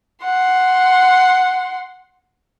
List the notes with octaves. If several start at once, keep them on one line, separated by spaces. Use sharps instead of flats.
F#5 C6